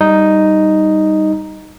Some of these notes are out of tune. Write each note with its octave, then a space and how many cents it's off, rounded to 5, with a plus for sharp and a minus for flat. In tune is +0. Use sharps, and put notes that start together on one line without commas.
G3 +0 D#4 +0